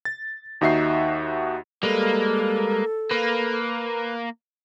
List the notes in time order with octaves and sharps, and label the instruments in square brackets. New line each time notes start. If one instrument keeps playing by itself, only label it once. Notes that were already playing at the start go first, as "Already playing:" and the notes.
[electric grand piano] A6
D#2 D#4 F#4 E5 F#5 C7
[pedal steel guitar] G3 G#3 B4 [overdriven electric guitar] A#3 [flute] A4
[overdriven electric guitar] A#3 [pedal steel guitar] B4